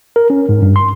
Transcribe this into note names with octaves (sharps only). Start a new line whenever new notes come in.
A#4
C#4
G#2
G2
C6